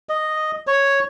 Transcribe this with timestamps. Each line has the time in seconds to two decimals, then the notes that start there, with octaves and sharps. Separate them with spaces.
0.09 D#5
0.67 C#5